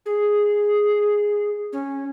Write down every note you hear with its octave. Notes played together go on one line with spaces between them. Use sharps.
G#4
C#4